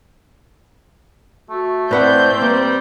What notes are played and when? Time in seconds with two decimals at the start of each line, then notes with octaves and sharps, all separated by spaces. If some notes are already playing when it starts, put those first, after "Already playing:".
1.50 A3 F#4
1.91 A2 C4 B4 D5 F#5 G6
2.42 G3 A#3 B4